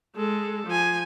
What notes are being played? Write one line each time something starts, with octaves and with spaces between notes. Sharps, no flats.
G#3 A4
F3 G#5